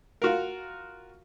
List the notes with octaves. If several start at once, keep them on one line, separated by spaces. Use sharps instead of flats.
F4 F#4 A#4